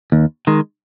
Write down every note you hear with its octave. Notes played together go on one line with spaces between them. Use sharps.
D#2
D#3 G#3